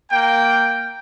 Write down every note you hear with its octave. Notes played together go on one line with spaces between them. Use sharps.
A#3 G5